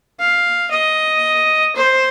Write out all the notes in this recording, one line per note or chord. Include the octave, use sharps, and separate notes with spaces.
F5
D#5
C5